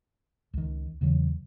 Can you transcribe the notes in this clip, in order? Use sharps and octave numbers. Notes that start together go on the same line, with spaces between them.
C#2 D#3
E2 C#3 E3 F#3